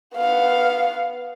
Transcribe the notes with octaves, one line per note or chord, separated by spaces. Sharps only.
B3 F5